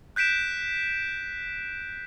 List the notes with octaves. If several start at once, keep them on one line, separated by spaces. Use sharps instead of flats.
F#6 G6 B6 D7 E7